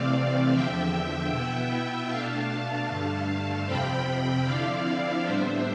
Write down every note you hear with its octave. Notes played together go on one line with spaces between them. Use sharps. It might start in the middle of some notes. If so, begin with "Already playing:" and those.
Already playing: C3 E3 A3 C4 D5 F5
E2 D3 F3 E5 G5
B2 B3 E4
B2 A3 D4 F5 A5
G2 D3 A3
F2 C3 F3 C4 G5 B5
D3 F3 C4 E4 D5 F5
A2 G3 B3 D4 C5 E5